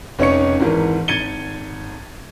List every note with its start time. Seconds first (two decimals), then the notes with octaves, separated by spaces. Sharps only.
0.19 F1 C#4 D#4 C#5 C#6 C#7
0.60 G#1 G#2 E3 A#4
1.08 G#1 G#6 A6 C#7 D#7 G7